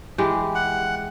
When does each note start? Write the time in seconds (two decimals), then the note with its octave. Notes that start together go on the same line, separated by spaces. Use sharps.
0.18 E3 G#3 G4
0.55 F#5